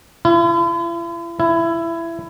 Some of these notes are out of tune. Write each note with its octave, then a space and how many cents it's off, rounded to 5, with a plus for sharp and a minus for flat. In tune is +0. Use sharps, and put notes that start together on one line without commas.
E4 +45
E4 +20